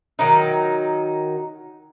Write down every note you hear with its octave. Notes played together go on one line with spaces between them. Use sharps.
D#3 F#3 D#4